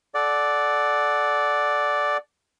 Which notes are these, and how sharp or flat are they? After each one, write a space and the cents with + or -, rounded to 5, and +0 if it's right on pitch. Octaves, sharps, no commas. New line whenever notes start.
A4 -30 D5 +0 F#5 +0